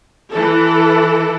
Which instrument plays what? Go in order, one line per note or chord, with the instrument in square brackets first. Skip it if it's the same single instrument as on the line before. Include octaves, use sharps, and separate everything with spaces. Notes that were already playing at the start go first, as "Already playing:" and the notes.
[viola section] E3 A4